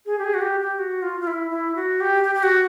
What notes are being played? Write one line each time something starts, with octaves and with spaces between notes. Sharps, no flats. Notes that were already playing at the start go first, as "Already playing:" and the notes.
G#4
G4
G#4
F#4
G4
G4
F#4
F4
F4
E4
E4
F#4
G4
G4
G4
F#4